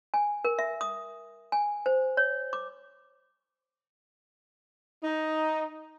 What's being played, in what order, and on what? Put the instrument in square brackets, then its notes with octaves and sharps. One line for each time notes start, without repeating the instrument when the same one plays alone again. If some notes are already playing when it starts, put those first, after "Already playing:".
[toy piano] G#5
A#4
E5
D#6
G#5
C5
C#5
D6
[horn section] D#4